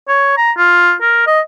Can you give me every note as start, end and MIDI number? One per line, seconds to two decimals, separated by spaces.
0.08 0.35 73
0.37 0.51 82
0.57 0.93 65
1.01 1.25 70
1.27 1.41 75